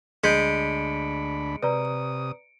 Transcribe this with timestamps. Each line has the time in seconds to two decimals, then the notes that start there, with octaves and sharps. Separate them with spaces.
0.24 D2 G#3 D4 B5 G6 B6 C#7 D7
1.63 C3 B4 D5 A#5 D#6